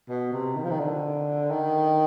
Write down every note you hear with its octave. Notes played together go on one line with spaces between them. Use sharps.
B2
C3
D#3
F3
D#3
D3
D#3